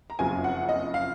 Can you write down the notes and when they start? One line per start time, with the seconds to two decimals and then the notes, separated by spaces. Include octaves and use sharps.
0.10 A#5
0.19 F#1 F2 C#3 F#3 G#5
0.44 F#5
0.69 D#5
0.94 F5